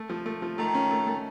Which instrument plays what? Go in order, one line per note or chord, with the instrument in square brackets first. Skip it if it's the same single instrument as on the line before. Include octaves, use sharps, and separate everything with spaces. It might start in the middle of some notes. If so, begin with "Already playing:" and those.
Already playing: [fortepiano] A3
F3
A3
F3
[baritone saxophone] D#3 [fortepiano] A3
[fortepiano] C#4
A3
A3